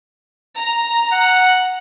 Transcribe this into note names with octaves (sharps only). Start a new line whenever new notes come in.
A#5
F#5